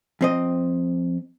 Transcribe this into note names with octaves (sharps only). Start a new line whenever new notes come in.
F2 C4 D#5